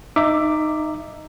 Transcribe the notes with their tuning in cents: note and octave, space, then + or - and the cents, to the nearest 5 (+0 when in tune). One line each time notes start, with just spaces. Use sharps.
D#4 -10 E5 +15 D6 +0